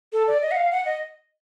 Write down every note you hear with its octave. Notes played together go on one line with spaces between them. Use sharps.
A4
D5
D#5
F#5
F5
F#5
D#5